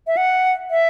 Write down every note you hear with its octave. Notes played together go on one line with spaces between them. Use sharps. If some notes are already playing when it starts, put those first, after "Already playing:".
E5
F#5
E5